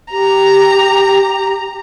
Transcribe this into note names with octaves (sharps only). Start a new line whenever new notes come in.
G4 A#5